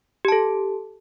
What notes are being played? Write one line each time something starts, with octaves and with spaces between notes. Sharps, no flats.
G4 A4 A5